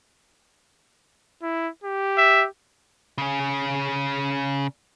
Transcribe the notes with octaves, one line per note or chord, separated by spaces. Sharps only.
E4
G4
E5
C#3 C#4